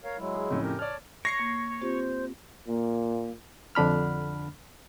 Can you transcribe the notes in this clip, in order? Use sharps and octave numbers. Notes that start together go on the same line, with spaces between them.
A#4 C#5 F5
F#3 G#3 E4
G#4
F2 A2 C#3
G4 A#4
C#5 D5 A5 F6
C#5 A#6 C7 C#7
A#3
C4 F4 G4 C5
A#2 A#3
F2 D3 D4 B5 F6